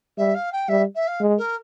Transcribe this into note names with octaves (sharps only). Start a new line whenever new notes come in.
G3 E5
F5
G5
G3 E5
E5
F5
G#3
A#4